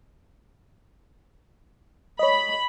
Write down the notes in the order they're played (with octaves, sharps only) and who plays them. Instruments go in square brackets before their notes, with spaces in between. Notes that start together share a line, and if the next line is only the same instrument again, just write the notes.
[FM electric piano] C#5 D#5 [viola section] B5